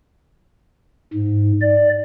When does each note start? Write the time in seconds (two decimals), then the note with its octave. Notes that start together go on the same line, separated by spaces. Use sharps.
1.14 G#2
1.61 D5